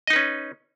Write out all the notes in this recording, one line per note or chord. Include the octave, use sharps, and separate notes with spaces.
C#4 D#4 B4 D#5